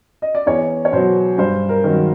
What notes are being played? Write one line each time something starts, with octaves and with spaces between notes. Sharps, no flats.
D#5
D5
E2 C#5
C#5
B2 F#3 C5
G2 C5
A#4
D#3 F#3